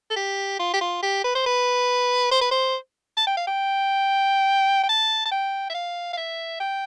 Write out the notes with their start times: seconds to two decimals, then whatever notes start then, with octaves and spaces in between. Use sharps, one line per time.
0.10 A4
0.16 G4
0.59 F4
0.73 G4
0.81 F4
1.02 G4
1.24 B4
1.35 C5
1.46 B4
2.31 C5
2.41 B4
2.51 C5
3.17 A5
3.27 G5
3.37 F5
3.47 G5
4.83 G5
4.89 A5
5.25 A5
5.31 G5
5.69 E5
5.74 F5
6.13 F5
6.17 E5
6.60 G5